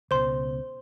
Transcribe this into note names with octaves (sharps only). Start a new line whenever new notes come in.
C#2 B2 C5 C6